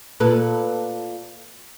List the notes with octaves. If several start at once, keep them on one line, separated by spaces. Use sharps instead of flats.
A#2 A4 B4